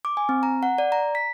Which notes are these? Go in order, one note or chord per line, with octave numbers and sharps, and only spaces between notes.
D6
G#5
C4
A#5
F#5
D5
A#5
B6